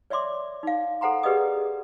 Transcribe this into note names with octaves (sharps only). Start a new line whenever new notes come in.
C#5 D5 E5 C6 D6
D#4 F5
A4 C5 F#5 A#5 C6
G4 G#4 B4 D5 D#5 D#6